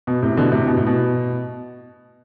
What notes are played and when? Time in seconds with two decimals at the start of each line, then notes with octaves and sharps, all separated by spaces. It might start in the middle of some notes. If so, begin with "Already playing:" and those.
0.07 B2
0.22 A2 C3
0.37 B2 D3
0.52 A2 C3
0.67 B2
0.77 A2
0.86 B2